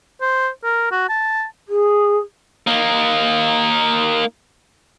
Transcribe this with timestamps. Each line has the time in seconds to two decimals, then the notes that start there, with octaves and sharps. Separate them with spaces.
0.21 C5
0.64 A#4
0.92 F#4
1.09 A5
1.68 G#4
2.67 A#3 D#4